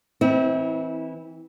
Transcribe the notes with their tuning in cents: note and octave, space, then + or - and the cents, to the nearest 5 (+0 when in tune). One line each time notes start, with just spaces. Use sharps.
E3 -15 C4 +0 E4 -35